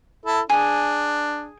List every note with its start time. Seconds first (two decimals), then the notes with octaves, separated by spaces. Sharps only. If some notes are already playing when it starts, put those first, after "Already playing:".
0.25 E4 A4
0.50 D4 G#4